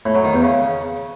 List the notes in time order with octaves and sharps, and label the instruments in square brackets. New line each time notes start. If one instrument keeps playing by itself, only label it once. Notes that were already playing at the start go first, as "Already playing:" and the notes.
[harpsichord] A2
F#3
D#3
E2
C#3